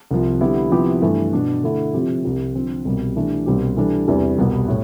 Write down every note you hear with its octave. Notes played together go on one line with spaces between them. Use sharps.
C2 C3 F3
D3 G3 B3 E4 G4
C3 F3 B3 E4 G4
G2 E3 A3
B2 B3 D4
D3 A3 E4 A4
C3 F3 C4 G4
C2 C3 G3 C4
D3 F3 C4
C2 B2 G3
E3 A3 D4 G4
C2 B2 G3 C4 G4
E3 G3 D4 A4
E2 C3 E3 G3
C2 B2 G3 B3
A2